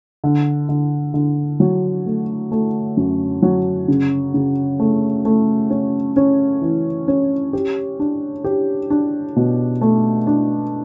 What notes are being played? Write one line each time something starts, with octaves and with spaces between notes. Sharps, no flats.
D3
D3
D3
F#3
A3
A3
F#2
F#3
C#3
C#3
A3
A3
C#4
C#4
E3
C#4
G4
D4
G4
D4
B2
A3
D4